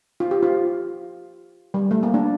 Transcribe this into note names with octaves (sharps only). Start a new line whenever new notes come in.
F4
G4
F4
G3
A3
A#3
D4